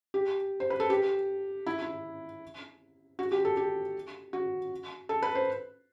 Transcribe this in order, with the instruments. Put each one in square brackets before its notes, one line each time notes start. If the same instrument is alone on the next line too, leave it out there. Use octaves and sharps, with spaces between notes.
[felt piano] G4
C5
B4
A4
G4
E4
E4
F#4
G4
A4
G4
F#4
A4
B4
C5